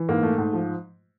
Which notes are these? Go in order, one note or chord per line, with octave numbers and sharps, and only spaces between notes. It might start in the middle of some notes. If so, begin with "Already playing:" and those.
Already playing: E3
G#2 A#3
A3
G#2
F3